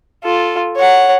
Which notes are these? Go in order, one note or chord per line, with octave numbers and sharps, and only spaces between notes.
F4 A4
C#5 F#5